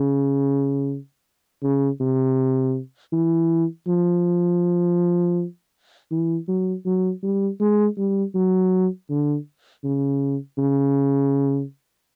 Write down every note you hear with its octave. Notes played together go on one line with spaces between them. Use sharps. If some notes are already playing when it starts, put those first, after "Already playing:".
Already playing: C#3
C#3
C3
E3
F3
E3
F#3
F#3
G3
G#3
G3
F#3
D3
C#3
C#3